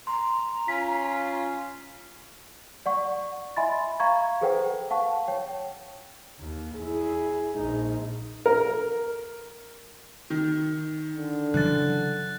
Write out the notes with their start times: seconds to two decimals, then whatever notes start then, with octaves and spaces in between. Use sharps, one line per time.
0.07 A#5 C6
0.68 C#4 F4 B6
2.86 D5 F#5 C#6
3.57 D#5 E5 G#5 B5 C6 A6
4.00 F5 A#5 C#6 G#6
4.41 G#4 A4 B4 C5 F#5 G5
4.90 F5 F#5 A5 C#6
5.28 C#5 G5
6.40 D#2
6.75 E2 E4 G#4
7.55 A#1 G#3 D#4
8.46 A#4
10.30 D#3
11.16 D3
11.54 C#3 E3 F#3 F#6 A6